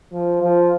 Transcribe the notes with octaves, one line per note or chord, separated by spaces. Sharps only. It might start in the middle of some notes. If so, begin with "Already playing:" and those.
F3
F3